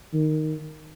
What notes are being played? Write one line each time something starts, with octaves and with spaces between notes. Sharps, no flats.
D#3